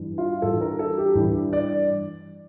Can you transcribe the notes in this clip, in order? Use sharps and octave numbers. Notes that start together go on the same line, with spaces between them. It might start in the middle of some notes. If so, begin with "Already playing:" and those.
Already playing: G2 E3
F4
G2 E3 A4
A#4
A4
G4
G2 E3 E4
D5